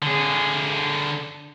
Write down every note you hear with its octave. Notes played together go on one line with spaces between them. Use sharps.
D3 G#4